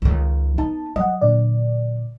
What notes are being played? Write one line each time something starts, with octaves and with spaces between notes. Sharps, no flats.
C#2 D#3
B3 D#4 A5
F#3 D#5 F#5
A#2 D3 D5